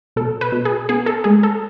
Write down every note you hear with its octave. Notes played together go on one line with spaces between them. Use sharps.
B2 A4
B4
B2
G#4
B3 G#4
A4
G#3 G#4
A4